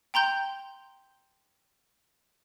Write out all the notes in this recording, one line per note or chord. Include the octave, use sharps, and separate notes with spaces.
G5 A#5 C6 G6